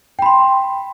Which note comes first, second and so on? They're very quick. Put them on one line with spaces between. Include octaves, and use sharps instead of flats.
G5 B5 C6